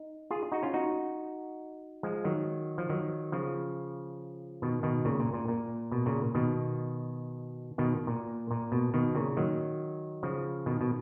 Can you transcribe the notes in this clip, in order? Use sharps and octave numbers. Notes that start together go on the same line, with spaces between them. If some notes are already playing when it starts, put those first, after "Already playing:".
Already playing: D#4
F4 G#4
D#4 F#4
C#4 F4
D#4 F#4
F3 G#3
D#3 F#3
F3
D#3 F#3
C#3 F3
B2 D#3
B2 D#3
A#2 C#3
A#2
A#2
A#2
B2
A#2 C#3
B2 D#3
B2 D#3
A#2
A#2
B2
B2 D#3
A#2 C#3
D#3 F#3
C#3 F3
B2 D#3
B2